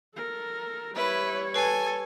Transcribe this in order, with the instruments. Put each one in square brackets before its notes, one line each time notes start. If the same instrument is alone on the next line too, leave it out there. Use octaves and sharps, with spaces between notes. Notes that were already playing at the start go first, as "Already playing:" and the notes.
[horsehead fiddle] A4 A#4
[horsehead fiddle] G3 C#5 [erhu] E4 [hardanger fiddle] B4
[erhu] A4 [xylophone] B4 C7 [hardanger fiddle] G#5